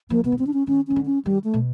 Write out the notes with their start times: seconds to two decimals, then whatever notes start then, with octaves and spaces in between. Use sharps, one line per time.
0.10 F3 A#3
0.24 C3 B3
0.32 C#3
0.39 D3 C4
0.47 D4
0.54 C#4
0.67 D#3 C#4
0.87 D#3 C#4
0.96 D3
1.06 C#4
1.25 D#3 G3
1.44 A3
1.54 B2